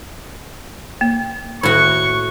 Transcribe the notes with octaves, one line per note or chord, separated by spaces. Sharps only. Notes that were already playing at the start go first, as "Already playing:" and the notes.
A#3
A2 D#3 F#4 C#6